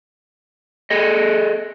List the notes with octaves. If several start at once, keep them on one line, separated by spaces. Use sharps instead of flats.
G#4 A4 D#5